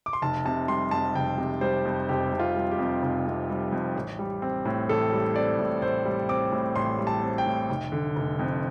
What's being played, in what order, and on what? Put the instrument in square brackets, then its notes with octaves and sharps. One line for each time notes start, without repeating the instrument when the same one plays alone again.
[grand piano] D6
C6
F1 A5
C3 A5
G3 C6
F2 A5
F1 G5
C3
G3 C5
F2
F1 G4
C3
F4
G3
G4
F2
F1
C3
G3
F2
A1
G3
C4
A2
A1 A4
G3
C4 D5
A2
A1 C5
G3
C4 D6
A2
A1 C6
G3
A5
C4
G5
A2
F1
D3
F1
F2